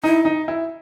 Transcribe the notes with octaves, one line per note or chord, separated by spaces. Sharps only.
D#4 E4
D#4
E4